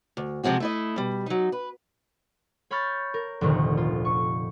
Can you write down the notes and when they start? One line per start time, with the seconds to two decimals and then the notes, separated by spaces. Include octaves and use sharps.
0.17 D2
0.43 C3 F3 G#3 C4 F#4
0.60 A3 E4 D#5
0.96 B2 G3
1.26 F#3 D#4
1.52 B4
2.71 C#5 B5 C#6 F6 G6 A6
3.14 A#4
3.41 F1 D2 A#2 D#3
3.77 F4
4.05 C#6